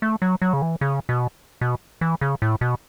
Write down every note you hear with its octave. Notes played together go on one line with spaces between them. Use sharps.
A3
F#3
F#3
C#3
E3
C#3
B2
B2
E3
C#3
A2
B2